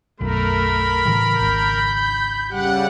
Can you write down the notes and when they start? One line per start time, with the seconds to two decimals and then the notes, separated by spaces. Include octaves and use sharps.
0.21 B1 F#2 A3 A#4 B5
1.06 A2 C#3 E3
1.39 G#1 C#2 G6
2.51 C#3 G3 G4 F#5 F#6